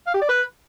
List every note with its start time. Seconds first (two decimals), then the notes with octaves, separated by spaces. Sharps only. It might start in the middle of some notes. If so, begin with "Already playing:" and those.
0.07 F5
0.14 G4
0.22 D5
0.29 B4